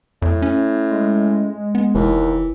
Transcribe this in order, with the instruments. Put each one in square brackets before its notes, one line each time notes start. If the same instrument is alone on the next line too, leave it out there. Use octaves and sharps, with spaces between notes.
[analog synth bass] F2 [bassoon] A2
[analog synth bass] C#4
[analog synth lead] G#3
[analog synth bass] B3
[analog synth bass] F1 [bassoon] D#2 [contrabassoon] E3